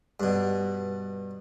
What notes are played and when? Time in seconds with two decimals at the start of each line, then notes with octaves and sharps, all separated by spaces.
0.20 G2 B2